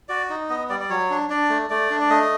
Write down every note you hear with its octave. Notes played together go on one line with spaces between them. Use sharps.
F#4 D5
D#4
B3 D#5
G3 D5
D5
F#3 C#5
D4
D4 D5
A3
A3 D5
D4
D5
A3 D#5